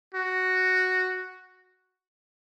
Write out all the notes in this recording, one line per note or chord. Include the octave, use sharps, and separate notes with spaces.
F#4